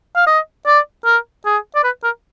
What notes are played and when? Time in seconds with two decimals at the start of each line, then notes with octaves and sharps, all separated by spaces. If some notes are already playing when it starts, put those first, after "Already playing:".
0.16 F5
0.27 D#5
0.67 D5
1.05 A#4
1.45 G#4
1.76 D5
1.84 B4
2.04 A#4